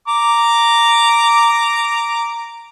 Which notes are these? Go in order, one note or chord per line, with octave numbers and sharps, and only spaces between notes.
A#5 D6